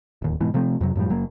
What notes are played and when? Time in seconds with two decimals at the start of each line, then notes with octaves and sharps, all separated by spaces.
0.22 D1 D#2
0.41 G#2 B2 E3
0.54 C3 F3 A3 C4
0.81 F2 C3 F#3
0.95 F#2 A2 F3 G3
1.10 F#1 F#3 A#3